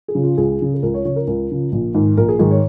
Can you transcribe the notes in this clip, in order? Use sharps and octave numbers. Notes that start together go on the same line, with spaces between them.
G#4
C#3 F3
F4
C#2 G#4
C#3 F3
G#4
C#2 A#4
C#5
C#3 F3 C#5
A#4
C#2 A#4
C#3 F3
A#1
G#2 D#3
A#1 A#4
G#4
G#2 D#3 G#4
C#5